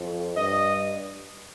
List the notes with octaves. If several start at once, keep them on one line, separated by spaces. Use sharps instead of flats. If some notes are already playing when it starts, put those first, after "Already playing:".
Already playing: F2
G2 D#5